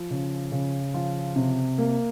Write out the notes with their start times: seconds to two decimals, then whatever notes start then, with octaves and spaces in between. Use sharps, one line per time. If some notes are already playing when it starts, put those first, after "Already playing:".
Already playing: F3
0.11 C#3
0.52 C#3
0.94 F3 F4
1.36 C3
1.78 A#3